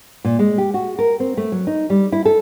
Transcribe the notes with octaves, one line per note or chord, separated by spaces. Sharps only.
A#2
G#3
G4
F#4
A#4
C4
A3
F#3
D#4
G3
E4
A4